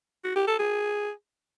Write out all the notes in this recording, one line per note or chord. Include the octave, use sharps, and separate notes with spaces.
F#4
G4
A4
G#4